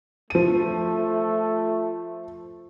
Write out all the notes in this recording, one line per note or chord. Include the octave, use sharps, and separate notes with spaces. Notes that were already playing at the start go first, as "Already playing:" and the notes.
F3 A3 D#7